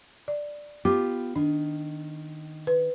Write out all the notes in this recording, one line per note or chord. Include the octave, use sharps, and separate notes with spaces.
D5
B3 F4 G4 D6
D#3 D4
B4